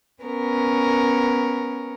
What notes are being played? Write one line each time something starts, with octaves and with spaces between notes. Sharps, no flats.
B3 C#4 A#4